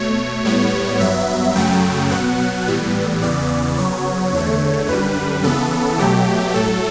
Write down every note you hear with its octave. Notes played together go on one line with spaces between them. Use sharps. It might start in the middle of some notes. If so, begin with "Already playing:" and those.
Already playing: B2 A3 C#5
A2 G3 B3 C#5
G2 F#3 B3 E5
F#2 C#3 F#3 A3 G5
B2 F#3 B3 F#5
A2 E3 G3 B3
E2 C#3 E3 B3 D5
C#3 F#3 B3 C#5
E2 D3 A3 C#5
F#2 D3 G3 B4
C#3 E3 B3 A4
B2 F#3 A3 G4
A2 F#3 A3 A4